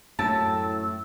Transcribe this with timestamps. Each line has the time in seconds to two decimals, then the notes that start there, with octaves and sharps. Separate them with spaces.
0.19 F#2 A2 A5 E6